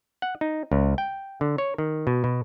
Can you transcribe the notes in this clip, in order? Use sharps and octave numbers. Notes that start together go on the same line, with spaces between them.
F#5
D#4
C#2
G5
D3
C#5
D#3
B2
B2